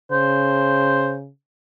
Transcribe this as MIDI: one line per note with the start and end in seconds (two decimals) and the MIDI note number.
0.11 1.29 49
0.11 1.14 72